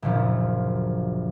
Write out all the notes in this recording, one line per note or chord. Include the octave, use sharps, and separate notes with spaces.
F#1 D2 A#2 F3